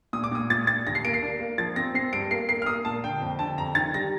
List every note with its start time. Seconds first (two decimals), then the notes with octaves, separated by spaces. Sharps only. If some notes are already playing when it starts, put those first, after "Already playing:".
0.13 A#2 D#6
0.24 D6
0.32 A#2 D#6
0.50 A#2 A6
0.67 A#2 A6
0.87 D#2 A#6
0.95 C7
1.05 A#3 D7
1.14 C7
1.23 D4
1.40 A#3
1.58 F3 A6
1.76 C4 A#6
1.94 C4 C7
2.13 G2 D7
2.31 A#3 C7
2.49 A#3 C7
2.62 F6
2.66 A#3 D#6
2.85 A#2 A5
3.03 D3 G5
3.21 F2
3.39 D3 A5
3.58 F2 A#5
3.75 D#3 A6
3.94 G3 A#6